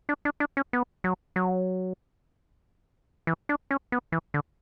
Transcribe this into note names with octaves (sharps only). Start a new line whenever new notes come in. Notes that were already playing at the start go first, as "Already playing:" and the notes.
D4
D4
D4
C#4
B3
F#3
F#3
E3
D4
C#4
B3
E3
D3